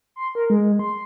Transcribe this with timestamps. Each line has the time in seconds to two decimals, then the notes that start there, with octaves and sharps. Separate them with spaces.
0.16 C6
0.35 A#4
0.50 G#3
0.79 C6